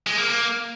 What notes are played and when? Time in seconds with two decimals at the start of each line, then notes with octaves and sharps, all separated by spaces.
0.07 G#3
0.18 A#3
0.30 A#3